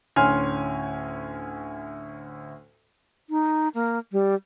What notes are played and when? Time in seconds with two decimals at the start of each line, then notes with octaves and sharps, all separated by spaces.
0.16 D2 A2 C#4 G#5 C6 F6
3.30 D#4
3.74 A#3
4.12 G3